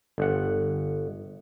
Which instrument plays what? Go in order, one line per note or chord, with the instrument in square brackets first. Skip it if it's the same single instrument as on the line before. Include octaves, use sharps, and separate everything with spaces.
[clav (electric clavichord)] G1 F#5